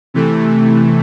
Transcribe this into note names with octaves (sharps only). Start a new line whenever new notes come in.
C3 E3 A3